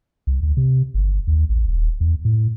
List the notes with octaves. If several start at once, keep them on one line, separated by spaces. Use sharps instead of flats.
C2
D2
C3
G1
D#2
A1
D#1
E2
A2